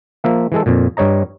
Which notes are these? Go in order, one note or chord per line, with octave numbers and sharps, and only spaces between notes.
F3 A#3 E5
E3 G#3 A4
F2 A#2
G2 G3 C#5 D#5 A#5